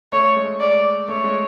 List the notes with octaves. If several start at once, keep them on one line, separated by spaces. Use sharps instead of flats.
A3 C#5
G#3
D5
A3 C#5
G#3